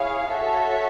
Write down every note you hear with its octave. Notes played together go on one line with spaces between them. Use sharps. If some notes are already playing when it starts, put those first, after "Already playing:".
Already playing: E4 G#4 C#5 F5
F#4 A4 C#5 E5